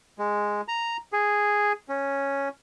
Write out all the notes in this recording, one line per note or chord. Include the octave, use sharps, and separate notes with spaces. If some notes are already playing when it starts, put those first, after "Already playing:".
G#3
A#5
G#4
C#4